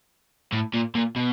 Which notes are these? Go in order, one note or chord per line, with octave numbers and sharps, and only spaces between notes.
A2
A#2
A#2
B2